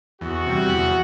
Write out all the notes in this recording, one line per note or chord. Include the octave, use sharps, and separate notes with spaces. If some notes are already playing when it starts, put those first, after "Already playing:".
E2 F#4
C3 G3
E2